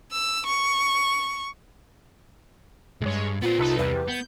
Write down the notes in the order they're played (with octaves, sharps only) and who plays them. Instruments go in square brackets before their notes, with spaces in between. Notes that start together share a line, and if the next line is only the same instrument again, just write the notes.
[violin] E6
C#6
[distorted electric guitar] C2 G2 [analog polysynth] G#3 C#5
[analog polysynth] A#2 [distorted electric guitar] B3 C5 [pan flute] F4
[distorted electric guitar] C2 [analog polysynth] D#4 A4 B4
[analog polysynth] E2 C3 G3 [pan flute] B4
[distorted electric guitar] B3 [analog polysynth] G6